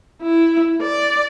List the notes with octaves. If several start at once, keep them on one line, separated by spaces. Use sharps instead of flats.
E4
D5